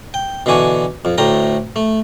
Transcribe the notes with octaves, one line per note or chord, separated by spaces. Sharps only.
G5
B2 D3 E3 D4 G#5 C#6
F2
D2 A2 A3 G5 A#5
A3